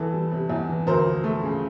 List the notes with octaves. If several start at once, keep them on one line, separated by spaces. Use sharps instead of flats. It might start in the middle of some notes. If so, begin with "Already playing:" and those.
Already playing: E2 E3 A4
G3
C3
E2
E3
D2 A#4 C5
F3
A3
C#3